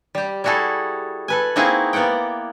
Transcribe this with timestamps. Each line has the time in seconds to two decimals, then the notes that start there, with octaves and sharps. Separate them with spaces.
0.15 G3 G4
0.44 G3 E4 F#4 G#4 A4
1.28 A4 B4 G#5
1.56 A#3 C4 D#4 E4 F#4 G#4
1.93 A#3 B3 D5 F#5 G5